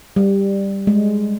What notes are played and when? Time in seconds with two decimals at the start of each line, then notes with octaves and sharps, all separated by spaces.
0.16 G3
0.87 G#3